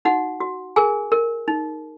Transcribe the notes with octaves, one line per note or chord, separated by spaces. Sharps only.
D#4 F#4 F#5
F#4
G#4 A#4 G#5
A#4
D#4